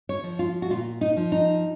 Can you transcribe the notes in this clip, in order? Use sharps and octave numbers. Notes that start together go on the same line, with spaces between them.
C#5
F3
F4
F#4
A#2 F4
D#4
F3
D#4